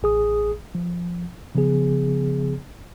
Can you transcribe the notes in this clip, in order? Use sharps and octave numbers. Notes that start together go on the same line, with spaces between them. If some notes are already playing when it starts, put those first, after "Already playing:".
A1 G#4 D#6
F3
C#3 F3 B3 G#4